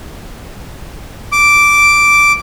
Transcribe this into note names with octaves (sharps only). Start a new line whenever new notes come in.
D6